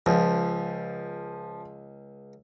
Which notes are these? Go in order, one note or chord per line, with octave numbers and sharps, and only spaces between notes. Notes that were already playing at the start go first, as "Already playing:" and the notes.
C#2 F3